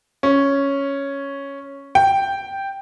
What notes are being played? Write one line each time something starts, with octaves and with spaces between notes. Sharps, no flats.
C#4
G5